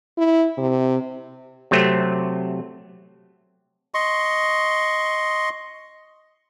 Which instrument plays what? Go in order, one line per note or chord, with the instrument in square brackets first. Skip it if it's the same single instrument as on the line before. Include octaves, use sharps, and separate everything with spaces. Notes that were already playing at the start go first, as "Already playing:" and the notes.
[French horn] E4
C3
[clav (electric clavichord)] C3 F#3 A3 C4
[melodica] D#5 C6 C#6